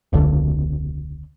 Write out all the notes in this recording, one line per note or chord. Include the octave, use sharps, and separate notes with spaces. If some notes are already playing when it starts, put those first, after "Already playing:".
E1 C#2 D3